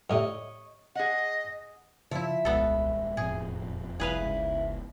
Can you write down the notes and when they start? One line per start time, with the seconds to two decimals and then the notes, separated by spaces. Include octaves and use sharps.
0.10 F2 A2 C3 C#5 D#5
0.95 G#4 D#5 F#5
2.11 C#3 F3 E4 E5
2.45 D#1 C2 G#3 B3 A4
3.17 E1 F2 A2 G#4
4.00 F#1 C2 F2 E4 G#4 B4 F5
4.20 C#2 G#2